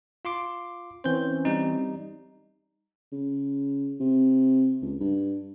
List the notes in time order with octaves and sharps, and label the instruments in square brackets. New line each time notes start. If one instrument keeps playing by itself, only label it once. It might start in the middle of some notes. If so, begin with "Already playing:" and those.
[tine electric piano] F4 C6 D6
[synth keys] E3 C4 C#4 [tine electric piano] C5 G6
[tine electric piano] G3 D#4
[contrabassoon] C#3
C3
C#2
G2